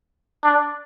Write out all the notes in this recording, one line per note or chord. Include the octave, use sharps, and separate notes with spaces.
D4